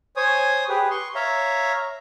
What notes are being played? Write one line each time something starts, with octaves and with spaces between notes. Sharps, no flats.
C5 C#5 G#5 D#6
G4 G#4 B4
C6 C#6
C#5 E5 F5 A#5